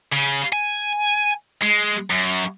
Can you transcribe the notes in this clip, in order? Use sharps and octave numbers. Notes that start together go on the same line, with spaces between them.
C#3
G#5
G#3
F#2